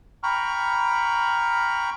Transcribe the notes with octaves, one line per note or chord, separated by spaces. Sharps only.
G5 A#5 B5 C#6 F6